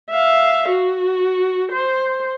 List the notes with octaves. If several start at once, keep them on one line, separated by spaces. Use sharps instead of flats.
E5 F5
F#4
C5